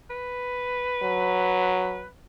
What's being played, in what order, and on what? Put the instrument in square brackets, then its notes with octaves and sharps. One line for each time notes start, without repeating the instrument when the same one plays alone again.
[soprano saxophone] B4
[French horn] F#3